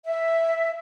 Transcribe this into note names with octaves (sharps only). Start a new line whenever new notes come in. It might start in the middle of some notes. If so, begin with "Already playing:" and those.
E5